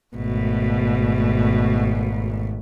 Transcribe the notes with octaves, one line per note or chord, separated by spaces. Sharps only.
G#1 B2 A3